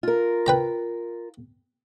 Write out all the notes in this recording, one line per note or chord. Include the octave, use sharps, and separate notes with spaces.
F4 A#4
B4 G5 A#5